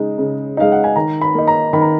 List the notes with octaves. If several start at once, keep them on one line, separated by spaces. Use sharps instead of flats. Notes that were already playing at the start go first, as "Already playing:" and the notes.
Already playing: C#3 G#3 D#4
C#3
G#3 D#4 F5
F#5
G#5
D#3 A#5
B5
A#3 D#4
A#5
D#3 B5
A#5